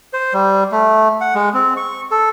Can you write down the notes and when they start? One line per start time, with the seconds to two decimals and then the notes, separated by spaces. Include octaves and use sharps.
0.13 C5
0.34 G3
0.72 A3
1.21 F#5
1.35 G#3
1.54 C4
1.77 C#6
2.11 A4